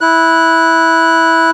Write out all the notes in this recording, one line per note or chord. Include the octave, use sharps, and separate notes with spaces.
E4 F#6